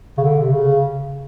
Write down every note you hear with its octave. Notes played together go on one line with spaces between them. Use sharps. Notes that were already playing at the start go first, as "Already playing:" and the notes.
C#3
D3
C3
C#3